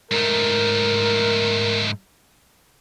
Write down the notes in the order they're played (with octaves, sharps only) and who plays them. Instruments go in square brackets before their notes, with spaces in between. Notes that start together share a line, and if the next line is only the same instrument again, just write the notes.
[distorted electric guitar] G#2 A3 [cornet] A#4